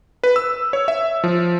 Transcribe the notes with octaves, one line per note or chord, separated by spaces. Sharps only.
B4
E6
C#5
E5
F3